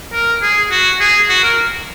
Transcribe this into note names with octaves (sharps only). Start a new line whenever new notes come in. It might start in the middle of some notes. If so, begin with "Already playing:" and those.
A#4
G#4
F#4
G#4
F#4
A#4